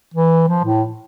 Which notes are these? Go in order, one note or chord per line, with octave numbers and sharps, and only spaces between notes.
E3
F3
A2